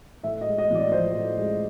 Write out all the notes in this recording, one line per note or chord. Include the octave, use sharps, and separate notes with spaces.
A2 E5
D#5
G#3
D#5
A1 D5
F3 C5
A2
G#3